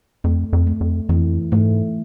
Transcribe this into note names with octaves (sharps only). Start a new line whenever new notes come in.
F2 A3
F2
A3
F2
F2 E3
G#2 A3